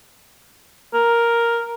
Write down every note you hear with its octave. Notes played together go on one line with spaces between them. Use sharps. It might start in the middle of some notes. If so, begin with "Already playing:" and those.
A#4